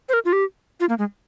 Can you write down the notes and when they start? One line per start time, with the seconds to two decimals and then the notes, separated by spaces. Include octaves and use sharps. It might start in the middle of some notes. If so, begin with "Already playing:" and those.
0.09 C5
0.13 A#4
0.25 F4
0.33 G4
0.80 F4
0.89 A#3
0.99 G#3